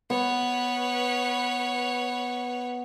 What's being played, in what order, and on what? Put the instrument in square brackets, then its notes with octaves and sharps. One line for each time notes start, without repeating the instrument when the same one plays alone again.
[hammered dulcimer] B3 [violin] B4 C#5